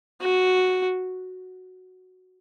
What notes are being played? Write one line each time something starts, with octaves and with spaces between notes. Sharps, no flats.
F#4